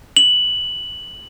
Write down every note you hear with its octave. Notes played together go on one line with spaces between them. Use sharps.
F#7